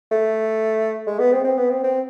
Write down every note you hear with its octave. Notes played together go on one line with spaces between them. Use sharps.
A3
G#3
B3
C4
C4
B3
C4
C4